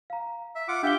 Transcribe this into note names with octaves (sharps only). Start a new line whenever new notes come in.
F5 A#5
E5
F4 F#5 D6
D4 G4 E5 F5 G7